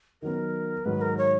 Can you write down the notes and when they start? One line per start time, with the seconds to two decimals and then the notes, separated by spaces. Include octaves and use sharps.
0.22 D#3 F#3 B3 A#4
0.85 G#2 D#3 F#3 B4
1.01 A#4
1.18 C#5